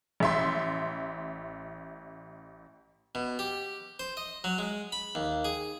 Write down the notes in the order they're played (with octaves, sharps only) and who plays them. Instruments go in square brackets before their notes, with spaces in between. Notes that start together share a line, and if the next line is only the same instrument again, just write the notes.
[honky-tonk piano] A1 E5 C6
[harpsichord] B2
G4
C5
D#5
F#3
G#3
B5
D#2
G#4